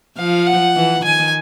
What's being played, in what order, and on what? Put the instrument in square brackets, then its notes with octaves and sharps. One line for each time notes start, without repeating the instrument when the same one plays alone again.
[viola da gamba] F3 [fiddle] F5
[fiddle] F#5
[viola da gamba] E3
[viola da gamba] D#3 [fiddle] G#5